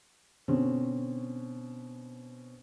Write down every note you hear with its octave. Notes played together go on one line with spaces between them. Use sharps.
B2 D3 C4 C#4